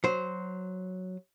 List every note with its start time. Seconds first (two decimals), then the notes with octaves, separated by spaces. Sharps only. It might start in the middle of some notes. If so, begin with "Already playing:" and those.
0.04 F#3 C5